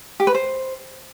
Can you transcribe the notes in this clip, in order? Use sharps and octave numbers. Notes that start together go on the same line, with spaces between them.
G4
B4
C5